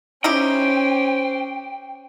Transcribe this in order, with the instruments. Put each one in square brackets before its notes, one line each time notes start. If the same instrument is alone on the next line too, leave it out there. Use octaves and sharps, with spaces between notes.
[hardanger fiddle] C#4 C5 [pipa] D#4 E4 G4 [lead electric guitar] G5